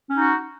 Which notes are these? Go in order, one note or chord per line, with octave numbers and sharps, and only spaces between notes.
C#4 D#4 F#4